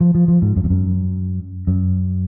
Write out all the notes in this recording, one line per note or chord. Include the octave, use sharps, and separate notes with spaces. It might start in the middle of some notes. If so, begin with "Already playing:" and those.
F3
F3
F3
G#2
F#2
F2
F#2
F#2